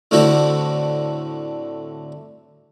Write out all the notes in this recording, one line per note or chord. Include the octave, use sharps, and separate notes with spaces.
A2 D3 C4 E4 F#4